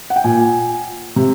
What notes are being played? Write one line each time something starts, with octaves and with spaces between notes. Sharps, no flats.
F#5
G5
A#2 G#5
C3